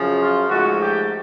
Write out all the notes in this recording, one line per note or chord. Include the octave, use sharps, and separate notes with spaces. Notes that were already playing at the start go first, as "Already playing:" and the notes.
Already playing: F#2 C#3 F3
F4
G#2 F3 A3 F#4
G4